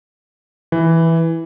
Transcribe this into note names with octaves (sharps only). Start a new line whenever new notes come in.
E3